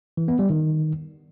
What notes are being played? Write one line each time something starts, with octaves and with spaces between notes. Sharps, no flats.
E3
B3
G3
D#3